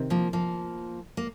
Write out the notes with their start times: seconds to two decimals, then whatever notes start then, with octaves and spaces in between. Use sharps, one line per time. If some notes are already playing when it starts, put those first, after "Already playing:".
Already playing: C3 D#3 C4
0.10 F3 A#3
0.33 F3 A#3
1.17 A#3